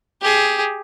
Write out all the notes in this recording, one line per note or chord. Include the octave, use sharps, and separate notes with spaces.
G4 G#4